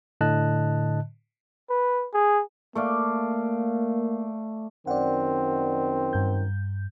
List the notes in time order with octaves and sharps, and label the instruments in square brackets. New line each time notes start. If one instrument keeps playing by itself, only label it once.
[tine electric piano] A2 D3 D#5 A5 F#6
[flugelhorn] B4
G#4
[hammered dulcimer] A3 D5 F5 [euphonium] A#3
[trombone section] F#2 D#3 C4 [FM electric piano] D5 F#5
[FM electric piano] G2 G6